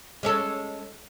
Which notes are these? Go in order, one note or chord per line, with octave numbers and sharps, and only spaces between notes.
G#3 C#4 A4